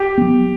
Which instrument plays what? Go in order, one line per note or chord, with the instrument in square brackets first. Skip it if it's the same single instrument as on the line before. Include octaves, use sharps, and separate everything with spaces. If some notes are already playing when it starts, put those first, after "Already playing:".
Already playing: [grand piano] G4
[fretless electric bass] F#3 B3